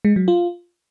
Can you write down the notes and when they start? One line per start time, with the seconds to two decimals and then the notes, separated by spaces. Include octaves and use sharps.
0.05 G#3
0.16 F#3
0.28 F4